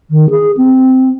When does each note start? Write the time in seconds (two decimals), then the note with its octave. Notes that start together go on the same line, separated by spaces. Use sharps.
0.10 D#3
0.29 G#4
0.57 C4